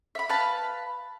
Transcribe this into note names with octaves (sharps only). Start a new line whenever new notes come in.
E5 B5
B4 F5 A5 B5